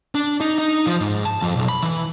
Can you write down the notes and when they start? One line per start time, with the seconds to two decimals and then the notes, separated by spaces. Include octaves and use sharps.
0.15 D4
0.41 D#4
0.58 D#4
0.87 F3
1.01 G#2
1.25 A5
1.42 F2
1.56 B1
1.69 B5
1.83 E3